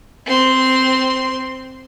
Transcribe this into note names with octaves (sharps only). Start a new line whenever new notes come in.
C4 C6